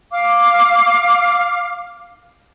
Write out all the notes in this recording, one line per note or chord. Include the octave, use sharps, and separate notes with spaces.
F5 D6